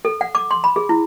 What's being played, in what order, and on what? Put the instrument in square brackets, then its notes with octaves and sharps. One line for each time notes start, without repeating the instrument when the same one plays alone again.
[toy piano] A4
F#5
D6
C6
B5
G#4
E4